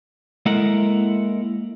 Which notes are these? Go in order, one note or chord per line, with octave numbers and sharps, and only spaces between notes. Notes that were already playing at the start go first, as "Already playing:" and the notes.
G#3 A#3 E4 A4 A#4 F#5